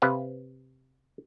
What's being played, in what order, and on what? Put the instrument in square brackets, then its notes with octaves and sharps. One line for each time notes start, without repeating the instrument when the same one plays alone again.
[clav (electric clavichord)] C3 B4 F5